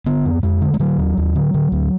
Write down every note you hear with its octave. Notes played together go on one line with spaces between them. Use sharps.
D3 B3
F2
F2 G#3
D3
G#3
D3 F#3
D#2
D#2
D3
D3
D2